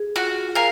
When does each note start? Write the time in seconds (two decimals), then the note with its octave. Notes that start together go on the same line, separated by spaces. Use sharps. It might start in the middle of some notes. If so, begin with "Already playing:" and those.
Already playing: G#4
0.16 F4 F#4
0.55 A#4 F5 G#5